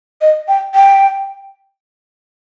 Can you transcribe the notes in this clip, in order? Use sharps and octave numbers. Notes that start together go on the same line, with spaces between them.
D#5
G5
G5